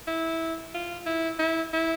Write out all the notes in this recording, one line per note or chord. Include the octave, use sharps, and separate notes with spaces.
E4
F4
E4
E4
E4